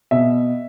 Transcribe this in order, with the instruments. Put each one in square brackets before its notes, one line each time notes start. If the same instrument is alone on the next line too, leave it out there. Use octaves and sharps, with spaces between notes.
[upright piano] B2 E5